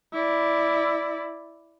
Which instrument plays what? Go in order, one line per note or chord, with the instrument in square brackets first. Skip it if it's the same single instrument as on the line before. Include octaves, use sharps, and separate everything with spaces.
[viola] E4 D5